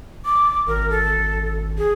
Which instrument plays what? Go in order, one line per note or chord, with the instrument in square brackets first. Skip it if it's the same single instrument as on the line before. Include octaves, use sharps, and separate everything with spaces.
[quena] D6
[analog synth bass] G#1 [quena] A#4
[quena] A4
G#4